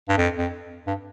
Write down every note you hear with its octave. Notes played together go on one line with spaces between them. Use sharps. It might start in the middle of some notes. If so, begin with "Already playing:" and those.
G2
F2
F2
G2